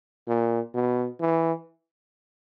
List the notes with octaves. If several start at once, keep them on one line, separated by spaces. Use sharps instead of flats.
A#2
B2
E3